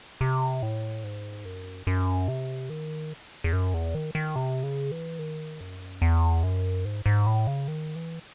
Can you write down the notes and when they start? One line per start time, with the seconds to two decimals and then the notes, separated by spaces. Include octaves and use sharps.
0.21 C3
0.62 A2
1.04 G#2
1.45 F#2
1.87 F#2
2.28 C3
2.70 D#3
3.44 E2
3.53 F#2
3.74 E2
3.95 D#3
4.15 D#3
4.36 C3
4.63 C#3
4.91 E3
5.19 D#3
5.61 F#2
6.02 E2
6.43 F#2
6.85 G#2
7.06 G#2
7.26 A2
7.47 C#3
7.68 D#3
7.96 E3